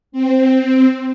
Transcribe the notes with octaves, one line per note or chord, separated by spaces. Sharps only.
C4